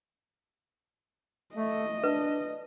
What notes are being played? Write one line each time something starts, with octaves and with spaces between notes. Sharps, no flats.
A3 D#5
D4 B4